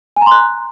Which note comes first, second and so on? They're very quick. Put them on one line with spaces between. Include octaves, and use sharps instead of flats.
G#5 A#5 C6 F#6